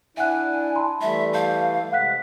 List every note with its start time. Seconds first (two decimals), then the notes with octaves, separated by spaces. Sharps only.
0.17 D4 E4 E5 F#5 G#5 F#6
0.75 A5 B5 C6
1.01 E3 G3 A3 E5
1.34 F5 A5 G6
1.92 C3 G#3 F#5 F#6 B6